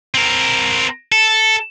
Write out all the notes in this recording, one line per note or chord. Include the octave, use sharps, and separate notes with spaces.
C4 A#4
A4